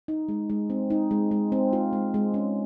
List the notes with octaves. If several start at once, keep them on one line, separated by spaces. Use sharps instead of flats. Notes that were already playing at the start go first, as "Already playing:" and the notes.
D#4
G#3
G#3
C4
D#4
G#3
G#3
C4
F4
G#3
G#3
C#4